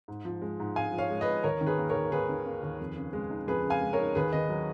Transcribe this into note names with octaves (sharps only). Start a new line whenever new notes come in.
G#2
F3
G#3
G#2
G#2 F5 G#5
F3
C#5 F5
G#3
B4 D#5
G#2
D#2 A#4 C#5
D#3
G#4 B4
A#3
D#2 A#4 C#5
D#2 G#4 B4
D#3
A#3
D#2
F2
C#3
G#3
D#4
F2 G#4 B4
C#3
F5 G#5
G#3
A#4 C#5
D#4
D#2 G#4 B4
D#3 B4 D#5
F#3